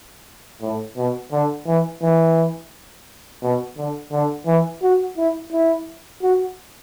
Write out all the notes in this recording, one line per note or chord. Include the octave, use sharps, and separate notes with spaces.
A2
B2
D3
E3
E3
B2
D3
D3
E3
F#4
E4
E4
F#4